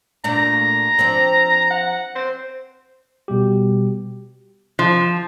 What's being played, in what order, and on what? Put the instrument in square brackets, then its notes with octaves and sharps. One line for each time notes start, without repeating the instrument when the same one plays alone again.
[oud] A#2 A3 D4 [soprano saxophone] A#5
[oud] F3 C4 D4
[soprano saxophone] F#5
C5
[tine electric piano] B2 G3 G4
[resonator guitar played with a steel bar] F3